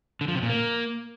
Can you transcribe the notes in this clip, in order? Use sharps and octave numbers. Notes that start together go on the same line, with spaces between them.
D3
F3
C3
A#2
A#3